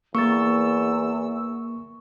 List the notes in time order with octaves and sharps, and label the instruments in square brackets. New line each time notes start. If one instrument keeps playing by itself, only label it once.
[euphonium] E2 [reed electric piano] A#3 A#4 A6 [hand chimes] C#6 [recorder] E6